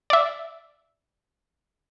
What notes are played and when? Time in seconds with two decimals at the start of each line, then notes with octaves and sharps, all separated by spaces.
0.10 D5 E5